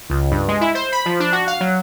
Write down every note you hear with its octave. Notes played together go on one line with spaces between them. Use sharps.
C#2
G2
G#3
E4
C5
B5
F3
D4
F#4
F5
F#3